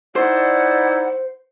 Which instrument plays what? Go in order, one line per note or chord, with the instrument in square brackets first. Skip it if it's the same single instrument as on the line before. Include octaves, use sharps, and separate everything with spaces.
[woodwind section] D#4 E4 D5 [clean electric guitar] C5 [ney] F#5